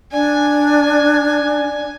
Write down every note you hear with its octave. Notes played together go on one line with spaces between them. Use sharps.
D4 D5 G#5